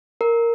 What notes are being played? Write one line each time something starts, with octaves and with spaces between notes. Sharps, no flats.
A#4